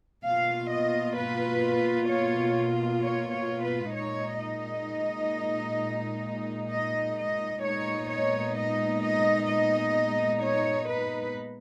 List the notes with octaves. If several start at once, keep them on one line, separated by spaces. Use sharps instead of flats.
B2 A#3 F4 F5
D#5
B4
C#5
C#5
C#5
B4
A#2 G#3 D#4 C#5
D#5
D#5
D#5
A#2 G#3 B3 D#4 C#5
C#5
D#5
D#5
D#5
C#5
B4